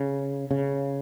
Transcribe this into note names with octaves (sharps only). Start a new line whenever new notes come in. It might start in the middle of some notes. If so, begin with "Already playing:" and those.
Already playing: C#3
C#3